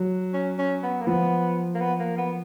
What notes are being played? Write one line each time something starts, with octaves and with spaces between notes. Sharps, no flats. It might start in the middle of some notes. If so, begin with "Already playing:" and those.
Already playing: F#3
C#4
C#4
B3
A#3
F3 B3
A#3
B3
A#3
B3